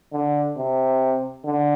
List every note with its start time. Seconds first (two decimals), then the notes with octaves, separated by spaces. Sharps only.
0.13 D3
0.57 C3
1.45 D3